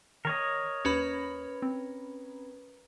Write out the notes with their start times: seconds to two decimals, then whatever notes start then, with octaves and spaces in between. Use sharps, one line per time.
0.25 D#3 A#4 C#5 D#5
0.85 D#2 C#4 B4 B5
1.62 C4